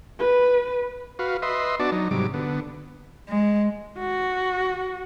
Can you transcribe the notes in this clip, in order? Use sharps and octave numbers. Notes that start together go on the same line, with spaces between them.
B4
F#4 B4 F5
B4 D#5 E5 C6
B3 D4 F#4 D5 A5
F#3 D#4
G#2 C3 F#3 G3 D6
D3 B3
G#3
F#4